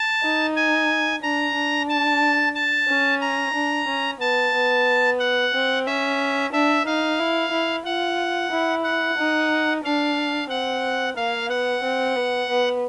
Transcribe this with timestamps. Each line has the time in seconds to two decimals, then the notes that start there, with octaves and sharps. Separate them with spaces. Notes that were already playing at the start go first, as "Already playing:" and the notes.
Already playing: A5
0.23 D#4
0.56 G#5
1.22 D4 A#5
1.55 D4
1.89 A5
2.55 A5
2.88 C#4
3.21 A#5
3.54 D4
3.88 C#4
4.20 B3 A5
4.54 B3
5.20 F#5
5.54 C4
5.86 C#4 E5
6.52 D4 E5
6.86 D#4 F5
7.19 E4
7.51 E4
7.85 F4 F#5
8.51 E4
8.84 F#5
9.18 D#4
9.84 D4 F5
10.50 C4 F#5
11.16 A#3 F5
11.49 B3 F#5
11.83 C4
12.16 B3
12.49 B3